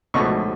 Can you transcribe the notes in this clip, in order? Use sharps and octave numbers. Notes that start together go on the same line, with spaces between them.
C#2 B2 A3 C#6